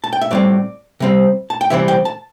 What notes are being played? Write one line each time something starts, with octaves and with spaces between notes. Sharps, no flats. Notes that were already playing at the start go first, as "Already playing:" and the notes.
A5
G5
E5
A2 G3 C4 D5
C3 G3 C4
A5
G5
C3 E3 G3 C4 E5
G5
A5